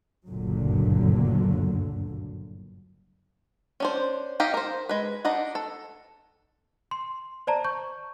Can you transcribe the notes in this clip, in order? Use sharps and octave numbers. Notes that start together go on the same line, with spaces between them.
F#1 D2 G2 A#2 D3 F#3
C#4 D4 C5
D#4 G4 D#5 F5
A#4 C5
G#3 B4
D4 D#4 D#5 F#5
A4
C6
C5 D5 A5 A#5
C#6 G6